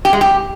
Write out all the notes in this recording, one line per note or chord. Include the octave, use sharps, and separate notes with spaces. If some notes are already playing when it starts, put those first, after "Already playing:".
G4
G#3
G4